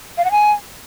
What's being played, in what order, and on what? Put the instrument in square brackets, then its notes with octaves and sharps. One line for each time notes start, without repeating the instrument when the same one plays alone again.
[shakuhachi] F5
F#5
G#5